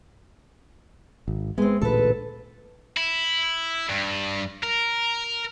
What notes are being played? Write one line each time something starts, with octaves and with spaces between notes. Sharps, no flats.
G#1
G#3 B3 C4
A1 D2 A#2 A4 B4
E4
G2
A#4